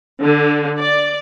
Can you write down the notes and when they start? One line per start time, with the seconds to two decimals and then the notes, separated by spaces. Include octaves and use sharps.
0.22 D3
0.78 D5